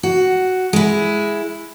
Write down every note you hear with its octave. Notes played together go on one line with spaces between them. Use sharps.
F#4
G#3 E4